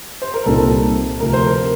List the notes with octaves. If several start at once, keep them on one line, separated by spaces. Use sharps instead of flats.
C5
A#4
C2 A#2 G3 C4 D#4 A4
D2 C3 F3 A#4
C5
A#4